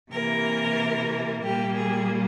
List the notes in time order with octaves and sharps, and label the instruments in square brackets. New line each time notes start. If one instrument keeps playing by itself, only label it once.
[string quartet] C3 E3 A#3 A#4
A#2 G3 A#3 G4
G#4